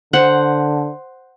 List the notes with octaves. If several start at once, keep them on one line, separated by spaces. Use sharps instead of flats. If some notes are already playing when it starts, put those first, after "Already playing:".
D3 C5 F#5